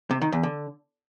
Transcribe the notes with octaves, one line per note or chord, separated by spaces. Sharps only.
C3
D#3
E2
D3